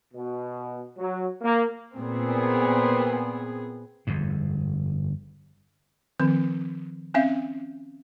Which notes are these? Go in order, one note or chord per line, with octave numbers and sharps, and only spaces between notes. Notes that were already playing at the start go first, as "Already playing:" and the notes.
B2
F#3
A#3
A#2 B3 C4 G#4
G1 F2 G#2
D#3 F3 C4
C4 C#4 E5 F5